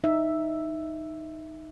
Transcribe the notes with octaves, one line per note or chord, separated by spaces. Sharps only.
D#4 E5